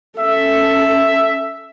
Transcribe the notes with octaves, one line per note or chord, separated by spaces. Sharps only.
C#4 A4 E5